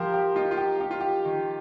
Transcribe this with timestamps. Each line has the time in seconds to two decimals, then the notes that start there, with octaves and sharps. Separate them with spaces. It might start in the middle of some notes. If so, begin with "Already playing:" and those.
Already playing: F3 G4 A#4 C5
0.13 G4
0.36 D#4 F4
0.51 F4
0.57 G4
0.80 D#4 G4
0.91 F4
1.01 G4
1.25 D#3